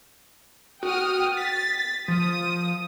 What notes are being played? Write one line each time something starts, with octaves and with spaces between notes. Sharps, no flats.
F#4 G5 D#6 F6
A6 B6
F3 D#6